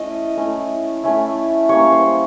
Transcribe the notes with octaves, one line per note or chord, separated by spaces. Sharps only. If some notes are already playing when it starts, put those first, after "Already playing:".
Already playing: A3 C#4 E4 D#5
A3 C#4 E4
A3 C#4 E4
G3 A#3 C#4 C#5
C5